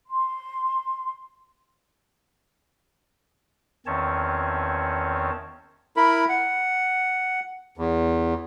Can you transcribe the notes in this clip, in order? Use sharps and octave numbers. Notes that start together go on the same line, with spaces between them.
C6
E2 D#3 C4 C#4 C#5 A5
E4 A#4 B5
F#5
E2